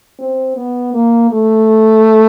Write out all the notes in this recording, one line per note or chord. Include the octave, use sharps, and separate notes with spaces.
C4
B3
A#3
A3